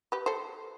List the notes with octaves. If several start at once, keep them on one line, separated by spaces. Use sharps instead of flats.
G4 B4
A4 C5